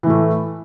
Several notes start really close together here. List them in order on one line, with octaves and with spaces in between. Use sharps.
E3 A2 A3